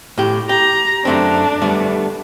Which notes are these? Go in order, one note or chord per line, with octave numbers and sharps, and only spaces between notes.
A2 G4
G4 A#5
F#2 A3 C4 D4
G3 A3 B3